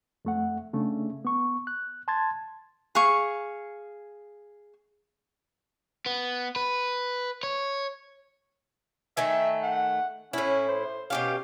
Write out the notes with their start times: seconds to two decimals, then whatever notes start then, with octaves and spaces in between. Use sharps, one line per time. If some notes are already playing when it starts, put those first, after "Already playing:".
0.25 F2 A3 F#5
0.73 C#3 A3 C#4 D4
1.25 B3 C#6
1.67 F#6
2.08 A5 C6 G#6 A6
2.95 G#4 F5 C#6
6.06 B3
6.56 B4
7.43 C#5
9.17 D#3 A3 E5 G#5
9.63 F#5
10.33 A2 C#4 E4
10.69 C5
11.10 B2 C#4 G4 F5